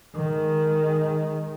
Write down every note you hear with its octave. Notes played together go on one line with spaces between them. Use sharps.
D#3 G#3